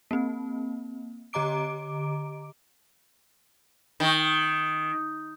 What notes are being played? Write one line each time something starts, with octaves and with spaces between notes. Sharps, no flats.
A#3 C4
D3 G4 D#5 A#5 D6 D7
D#3